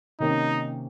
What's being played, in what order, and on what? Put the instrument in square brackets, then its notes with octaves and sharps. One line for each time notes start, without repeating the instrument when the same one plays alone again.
[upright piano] C3 D#3 A#3 C#4 [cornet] D#4